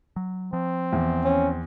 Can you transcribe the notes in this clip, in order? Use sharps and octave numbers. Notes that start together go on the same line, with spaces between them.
F#3
F3 C4
E2
C#4